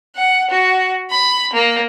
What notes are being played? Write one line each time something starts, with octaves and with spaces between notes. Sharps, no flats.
F#5
F#4
B5
A#3